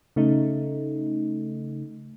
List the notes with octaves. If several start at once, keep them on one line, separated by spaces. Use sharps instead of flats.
C#3 A3 D#4